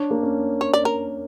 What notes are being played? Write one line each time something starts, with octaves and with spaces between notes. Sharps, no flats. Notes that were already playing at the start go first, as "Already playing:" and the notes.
Already playing: D4 C#5
A#3
C#4
C#5
D5
A#4